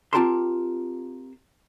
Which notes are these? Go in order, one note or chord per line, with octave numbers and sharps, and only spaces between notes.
C4 F4 G4 A#4 A5 C6